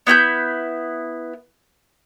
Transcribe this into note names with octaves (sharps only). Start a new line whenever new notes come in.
B3 E4 G5 G6